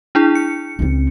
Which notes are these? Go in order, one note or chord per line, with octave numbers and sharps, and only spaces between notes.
D4 E4 G#4
C#7
C#2 C4